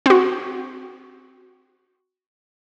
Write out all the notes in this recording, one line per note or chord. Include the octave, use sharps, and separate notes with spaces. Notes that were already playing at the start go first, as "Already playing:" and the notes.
C4 F#4